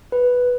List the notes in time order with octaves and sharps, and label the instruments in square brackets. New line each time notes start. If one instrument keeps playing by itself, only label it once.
[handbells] B4